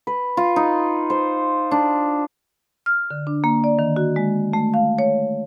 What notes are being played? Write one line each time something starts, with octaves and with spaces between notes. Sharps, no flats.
B4
F4
D#4
C5
D4
F6
D3
D4
A#3
D5
D#3
F#4
G#3
A3
F5
C#5